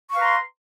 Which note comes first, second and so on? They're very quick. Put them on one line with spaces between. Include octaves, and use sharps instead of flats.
C#6 F5 B4 A#5 C6